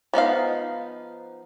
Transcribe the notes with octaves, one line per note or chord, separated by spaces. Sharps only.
F3 B3 D#4 F5